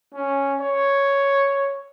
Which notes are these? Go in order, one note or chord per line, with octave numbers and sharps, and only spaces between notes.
C#4
C#5